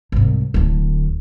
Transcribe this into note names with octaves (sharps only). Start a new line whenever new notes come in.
C2 G#2
D1 D3